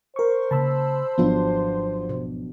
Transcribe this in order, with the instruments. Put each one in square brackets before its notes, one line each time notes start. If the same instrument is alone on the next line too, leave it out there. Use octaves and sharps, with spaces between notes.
[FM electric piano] A#4 C#6 [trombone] C5
[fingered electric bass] C#3 A#3 [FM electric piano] A5 B5 E6
[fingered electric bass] G#1 [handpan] F3 F#3 D4 [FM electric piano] B3 F4
[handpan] B2